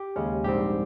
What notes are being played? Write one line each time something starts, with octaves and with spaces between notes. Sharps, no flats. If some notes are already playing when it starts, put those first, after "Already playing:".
Already playing: G4
D#2 C#3 G#3 C#4
A#1 G#2 G3 C4 G4